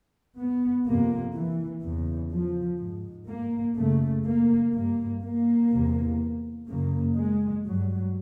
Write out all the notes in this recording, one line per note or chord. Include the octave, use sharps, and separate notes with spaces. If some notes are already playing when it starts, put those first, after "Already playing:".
B3
F2 C3 A#3
E3
E2 C#3
F3
G#2
A#3
F#2 C#3 A3
A#3
G2 A#3
A#3
E2 C3
F#2 C#3 A#3
G#3
G2 F#3